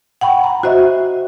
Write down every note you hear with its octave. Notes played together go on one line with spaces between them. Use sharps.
F#5 G5 B5 C#6
A#5
F#4 C5 D#5 E5